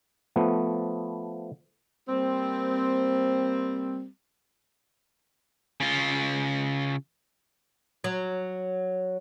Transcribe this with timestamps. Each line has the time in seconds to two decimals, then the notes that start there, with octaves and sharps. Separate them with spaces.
0.36 F3 A3 B3
2.08 G3 A#3 C4
5.80 C#3 F4
8.04 F#3